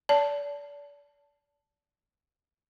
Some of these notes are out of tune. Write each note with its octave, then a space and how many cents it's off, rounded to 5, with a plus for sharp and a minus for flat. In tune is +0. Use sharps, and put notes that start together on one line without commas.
D5 -35 A5 +0